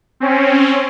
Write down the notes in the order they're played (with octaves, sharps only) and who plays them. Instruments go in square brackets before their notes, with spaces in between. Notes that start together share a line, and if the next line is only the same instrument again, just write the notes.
[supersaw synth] C4 C#4